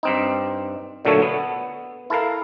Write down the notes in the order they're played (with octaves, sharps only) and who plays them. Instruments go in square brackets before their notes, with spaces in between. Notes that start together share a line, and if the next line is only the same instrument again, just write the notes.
[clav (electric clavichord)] G2 C4 D#4
A#2 D3 F#3 A3 A4 C#5
B3
E4 A4 A#4 F5